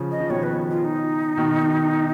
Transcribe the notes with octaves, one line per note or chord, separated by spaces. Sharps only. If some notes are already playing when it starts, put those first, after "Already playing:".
Already playing: C#3 F3
D#5
F3
B2 D#3 C#5
B4
F4
D#4
B2 D#3